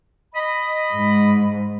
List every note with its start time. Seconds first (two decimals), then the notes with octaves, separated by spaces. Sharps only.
0.35 D#5 B5
0.92 G#2